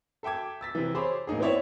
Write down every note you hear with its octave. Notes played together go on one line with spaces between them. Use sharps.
A4 E5 G5 D6 G#6
E6 A6 B6
C3 E3
G#4 C5 C#5 B5 D6
A1 A#3 D#4 G#4
B3 C4 E4 C#5 D5 E5